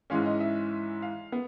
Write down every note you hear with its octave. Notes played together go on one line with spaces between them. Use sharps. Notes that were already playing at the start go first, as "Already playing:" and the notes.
G#2 E3 G#3 C#4 F5
D#5
E5
F5
B3